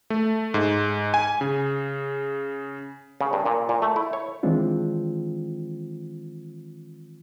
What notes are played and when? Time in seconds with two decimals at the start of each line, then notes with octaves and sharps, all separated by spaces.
0.10 A3
0.54 G#2
1.14 G#5
1.41 C#3
3.21 C#3
3.33 G2
3.46 A#2
3.69 A#2
3.82 A3
3.96 E4
4.13 C#5
4.43 D#3 E3 G#3 C4 D4 F4